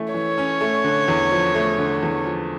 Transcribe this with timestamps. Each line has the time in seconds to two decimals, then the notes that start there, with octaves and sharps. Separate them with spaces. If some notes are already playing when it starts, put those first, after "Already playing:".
Already playing: E3 A3 C#4 E4
0.14 E3 C#5
0.38 C#4
0.61 A3
0.84 D3
1.08 E2
1.31 F3
1.55 A3
1.79 D3
2.03 E2
2.26 F3